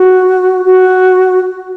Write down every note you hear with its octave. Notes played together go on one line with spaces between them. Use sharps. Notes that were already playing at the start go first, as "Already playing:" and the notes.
Already playing: F#4
F#4